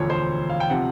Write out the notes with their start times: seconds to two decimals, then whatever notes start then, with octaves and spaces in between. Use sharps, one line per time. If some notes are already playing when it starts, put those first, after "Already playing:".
Already playing: E1 D2 D3 F3 C#5
0.10 C5
0.50 F5
0.60 G5
0.70 C3 F3 F#5